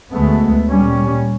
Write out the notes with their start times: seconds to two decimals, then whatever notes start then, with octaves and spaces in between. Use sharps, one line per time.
0.12 D2 G#3 A3 B3
0.70 A#2 G3 C#4